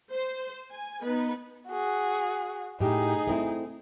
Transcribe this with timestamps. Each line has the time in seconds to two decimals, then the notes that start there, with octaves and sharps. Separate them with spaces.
0.11 C5
0.72 G#5
1.03 B3 D#4 B4
1.68 F#4 G#4
2.80 A2 D#4 G4 G#4
3.27 A3 C4 E4